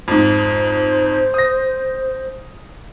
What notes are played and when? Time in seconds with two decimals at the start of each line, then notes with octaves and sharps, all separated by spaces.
0.08 F2 G#2 C5
1.34 D#6 A#6